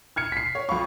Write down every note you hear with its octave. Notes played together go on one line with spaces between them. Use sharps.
F6 G#6 C#7
B6 C7
C#5
F2 F5 B5 C#6